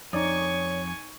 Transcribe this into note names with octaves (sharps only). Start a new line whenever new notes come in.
F2 D#4 C#5 D5 G#5 C#6 D#6